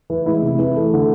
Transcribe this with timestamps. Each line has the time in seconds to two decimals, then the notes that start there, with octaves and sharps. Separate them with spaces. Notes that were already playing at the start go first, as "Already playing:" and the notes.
0.10 E3
0.26 G#3 E4
0.42 C3
0.59 E3
0.76 A3
0.93 D3